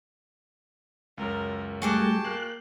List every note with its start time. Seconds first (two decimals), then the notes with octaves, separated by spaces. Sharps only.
1.18 C#2 F#2 A#4
1.82 G3 A3 F#4 G#4 G5 A5 D6
2.25 A#3 F#6 C7